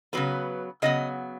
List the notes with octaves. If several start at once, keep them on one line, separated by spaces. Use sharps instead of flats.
C#3 F#3 B3 B4
C#3 F#3 B3 D#5